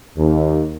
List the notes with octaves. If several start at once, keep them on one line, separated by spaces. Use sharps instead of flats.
D#2